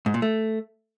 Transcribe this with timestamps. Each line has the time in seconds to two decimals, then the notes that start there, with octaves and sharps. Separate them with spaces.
0.06 G#2
0.14 A#2
0.22 A3